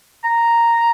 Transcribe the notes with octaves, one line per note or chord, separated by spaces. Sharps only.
A#5